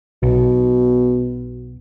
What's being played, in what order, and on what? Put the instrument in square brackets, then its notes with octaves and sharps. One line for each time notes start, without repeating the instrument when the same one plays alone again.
[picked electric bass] B1 [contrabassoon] B2